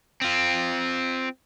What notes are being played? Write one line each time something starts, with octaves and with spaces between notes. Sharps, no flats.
C4 F4